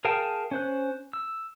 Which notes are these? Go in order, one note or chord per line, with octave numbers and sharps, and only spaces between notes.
G#4 A#4 F5 G5 A5
C#4 C5 F#6
E6